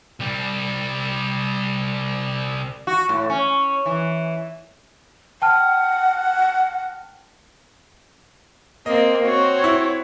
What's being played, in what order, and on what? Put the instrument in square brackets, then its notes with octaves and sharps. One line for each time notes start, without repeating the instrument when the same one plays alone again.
[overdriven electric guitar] C2 G3
[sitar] F#4
A2
C#4
E3
[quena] F#5 [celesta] G5 A5 F6
[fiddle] A#3 C4 [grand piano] D#5
[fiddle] C4 [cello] F#4 [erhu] C#5
[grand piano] E4